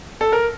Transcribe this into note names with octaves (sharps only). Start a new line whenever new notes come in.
A4
A#4